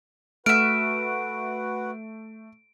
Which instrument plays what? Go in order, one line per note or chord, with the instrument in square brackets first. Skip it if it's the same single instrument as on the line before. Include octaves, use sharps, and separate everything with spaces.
[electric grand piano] A3 [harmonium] F#4 B4 F#5 [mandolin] E5 F6 [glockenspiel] D7